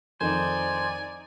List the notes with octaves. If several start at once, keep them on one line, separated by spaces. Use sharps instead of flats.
F2 D#3 D#4 C5 D5 G#5